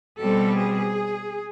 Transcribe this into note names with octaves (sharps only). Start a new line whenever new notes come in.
B2 G3 C4 A4
G#4